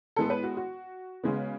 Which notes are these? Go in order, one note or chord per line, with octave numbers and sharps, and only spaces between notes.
A2 G#3 B3 A4
B4
F#4
F#4
C#3 G#3 B3